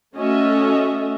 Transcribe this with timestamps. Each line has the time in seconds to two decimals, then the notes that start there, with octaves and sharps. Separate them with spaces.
0.17 A3 C#4 F#4 A4 D#5 E5